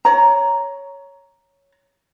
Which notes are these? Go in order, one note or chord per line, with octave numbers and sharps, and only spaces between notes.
C#5 A#5